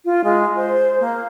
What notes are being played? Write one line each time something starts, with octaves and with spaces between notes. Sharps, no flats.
F4
G#3
C5
A#3